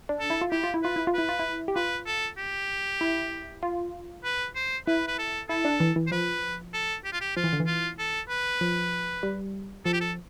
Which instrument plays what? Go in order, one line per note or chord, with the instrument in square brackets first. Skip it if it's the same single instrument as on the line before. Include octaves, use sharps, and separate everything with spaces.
[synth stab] D4
[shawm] A4
[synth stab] E4
F4
[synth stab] E4 [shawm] G4
[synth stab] F4
E4
[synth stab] F4 [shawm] B4
[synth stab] E4
F4
[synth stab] E4 [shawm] B4
[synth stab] F4
E4
G4
[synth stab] F4 [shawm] B4
[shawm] A4
G4
[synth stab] E4
F4
[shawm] B4
C5
[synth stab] E4 [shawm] B4
[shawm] B4
A4
[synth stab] E4 [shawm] A4
[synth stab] D4
E3
E3
[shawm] C5
[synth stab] F3 [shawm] B4
[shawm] A4
G4
F4
G4
[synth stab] F3 [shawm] F4
[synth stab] E3
D3
E3
[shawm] F4
A4
B4
[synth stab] F3
G3
[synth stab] F3 [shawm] A4
[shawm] G4
A4